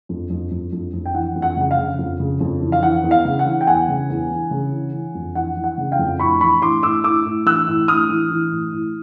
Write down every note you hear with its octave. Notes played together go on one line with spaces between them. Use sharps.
F2
F2
F2
F2
F2
G5
E3 F#5
F2
F#5
C#3 F#5
F5
C#3
F2
C#3
F2
E3
F5
E3 F#5
E2
F5
C#3
F#5
E3
G5
E2 F#5 G#5
C#3
E2
E3
C#3
E3
E3
F2
E3 F#5
E3
F#5
C#3
F5 G5
F2
A2 B5 C#6
E3 B5 C#6
A2 C6 D6
A2 D6 E6
A2 D6 E6
A2
E3 E6 F#6
A2
A2 D#6 F6
E3
E3
A2
A2